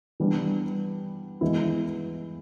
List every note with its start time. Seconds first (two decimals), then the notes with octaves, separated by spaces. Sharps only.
0.20 E3 G3 B3 D4
1.41 E3 G#3 B3 E4